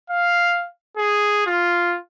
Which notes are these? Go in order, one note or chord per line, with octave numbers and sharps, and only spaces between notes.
F5
G#4
F4